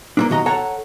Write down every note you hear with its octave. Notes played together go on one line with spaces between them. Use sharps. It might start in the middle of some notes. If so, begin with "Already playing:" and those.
A#3 C4 D4
B1 D#3 F#4 D#5 A#5
A4 C#5 F#5 A5 A#5